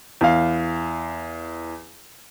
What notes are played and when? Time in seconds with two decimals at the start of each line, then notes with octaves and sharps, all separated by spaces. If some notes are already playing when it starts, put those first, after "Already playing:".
0.21 E2 F5